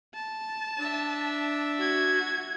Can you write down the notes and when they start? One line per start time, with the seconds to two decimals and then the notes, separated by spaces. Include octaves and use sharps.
0.15 A5
0.77 D4 E5
1.78 F#4 G#6